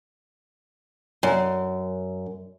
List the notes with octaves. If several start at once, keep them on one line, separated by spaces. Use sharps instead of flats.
F#2